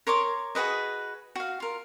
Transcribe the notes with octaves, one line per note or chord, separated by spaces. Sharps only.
A#4 C#5 C6 D6
F#4 G#4 B4 D#5
F#4 F5
F4 A#4